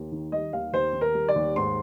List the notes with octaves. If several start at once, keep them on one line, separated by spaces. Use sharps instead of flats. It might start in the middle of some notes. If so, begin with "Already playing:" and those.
Already playing: D#2
D#3
G3 D#5
D#2 F5
D#2 C5
D#3
A#4
G3
D5
D#2
G#2 C6